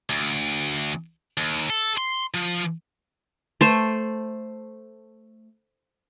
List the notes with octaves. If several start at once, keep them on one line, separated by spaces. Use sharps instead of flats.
D2
D#2
A4
C6
F3
A3 C5